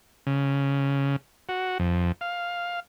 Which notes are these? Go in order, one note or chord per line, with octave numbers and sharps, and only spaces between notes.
C#3
F#4
F2
F5